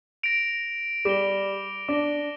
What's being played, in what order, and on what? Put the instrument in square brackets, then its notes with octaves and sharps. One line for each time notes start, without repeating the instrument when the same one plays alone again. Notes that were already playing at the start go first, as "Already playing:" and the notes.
[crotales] A#6 D7 F7
[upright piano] G3 [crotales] D6 A#6 G7
[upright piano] D4 [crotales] D6 A#6 G7